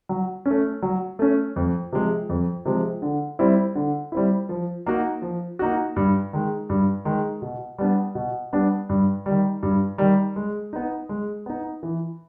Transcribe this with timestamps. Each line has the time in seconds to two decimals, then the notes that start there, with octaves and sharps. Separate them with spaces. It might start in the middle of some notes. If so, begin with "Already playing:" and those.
0.09 F#3
0.46 A3 C#4
0.82 F#3
1.19 A3 C#4
1.56 F2
1.92 C3 F3 G#3
2.29 F2
2.65 C3 F3 G#3
3.02 D3
3.39 G3 C4 E4
3.75 D3
4.12 G3 C4 E4
4.49 F3
4.86 A#3 D#4 F#4
5.22 F3
5.59 A#3 D#4 F#4
5.96 G2
6.33 D#3 G#3
6.70 G2
7.05 D#3 G#3
7.42 B2
7.78 G3 B3 D4
8.15 B2
8.53 G3 B3 D4
8.89 G2
9.26 D#3 G3
9.63 G2
9.98 D#3 G3
10.36 G#3
10.73 B3 D#4
11.09 G#3
11.46 B3 D#4
11.83 E3